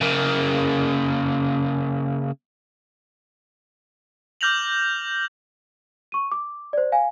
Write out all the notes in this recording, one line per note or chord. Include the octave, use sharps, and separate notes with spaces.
C#3 A#3
D6 F6 G6 A#6 F7 F#7
C#6 D#7
D6
C5 D5
F5 G#5